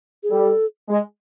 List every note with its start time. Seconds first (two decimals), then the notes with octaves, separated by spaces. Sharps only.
0.23 G#4
0.31 G3 A4
0.89 G#3